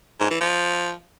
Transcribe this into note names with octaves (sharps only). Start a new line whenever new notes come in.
G#2
E3
F3